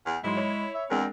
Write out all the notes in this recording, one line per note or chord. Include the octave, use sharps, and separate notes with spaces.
E2
G#2 F#3 G#3 E4 C6
C#5 B5
E5
E2 G#3 C4 D4 A#4